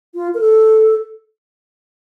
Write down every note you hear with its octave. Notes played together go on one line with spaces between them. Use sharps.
F4
A#4
A4